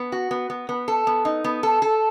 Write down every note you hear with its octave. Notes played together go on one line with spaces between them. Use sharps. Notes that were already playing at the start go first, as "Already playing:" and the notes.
Already playing: B3
F#4
B3
B3
B3
A4
B3
D#4
B3
A4
A4